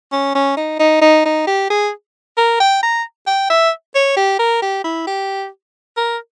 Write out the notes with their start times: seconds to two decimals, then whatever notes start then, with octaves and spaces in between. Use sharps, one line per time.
0.13 C#4
0.35 C#4
0.57 D#4
0.79 D#4
1.02 D#4
1.25 D#4
1.47 G4
1.70 G#4
2.37 A#4
2.60 G5
2.83 A#5
3.27 G5
3.50 E5
3.95 C#5
4.17 G4
4.39 A#4
4.62 G4
4.84 E4
5.07 G4
5.97 A#4